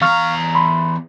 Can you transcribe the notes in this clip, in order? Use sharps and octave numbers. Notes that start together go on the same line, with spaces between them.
E2 F5 A#5 C#6 F6
B5 C6